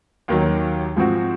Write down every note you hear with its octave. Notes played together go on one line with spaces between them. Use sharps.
D#2 D#3 F#3
G#2 F3 C4 F#4